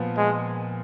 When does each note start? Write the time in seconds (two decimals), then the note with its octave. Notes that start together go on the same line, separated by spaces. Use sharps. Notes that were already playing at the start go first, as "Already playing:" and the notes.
Already playing: A#2 F3 B3
0.17 G#3